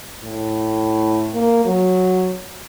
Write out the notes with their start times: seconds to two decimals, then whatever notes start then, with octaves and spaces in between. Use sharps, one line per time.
0.23 A2
1.34 A#3
1.65 F#3